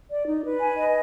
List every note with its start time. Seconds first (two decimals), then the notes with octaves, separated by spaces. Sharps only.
0.09 D5
0.26 D#4
0.43 B4
0.60 G#5
0.76 D#5